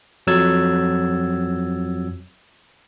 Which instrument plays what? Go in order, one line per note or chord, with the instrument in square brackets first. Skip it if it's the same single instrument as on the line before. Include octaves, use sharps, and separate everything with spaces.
[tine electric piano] F2 F#3 E6 G#6 A6